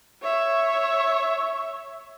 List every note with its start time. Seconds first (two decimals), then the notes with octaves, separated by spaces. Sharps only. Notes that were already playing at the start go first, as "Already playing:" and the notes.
0.23 C#5 E5